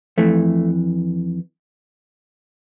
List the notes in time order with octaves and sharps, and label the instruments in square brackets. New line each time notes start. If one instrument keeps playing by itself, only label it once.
[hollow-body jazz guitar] F2 E3 A3